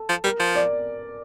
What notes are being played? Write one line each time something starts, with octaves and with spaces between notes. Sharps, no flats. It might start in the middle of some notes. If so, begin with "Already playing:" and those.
Already playing: A4
F3
G3 A#4
F3
D5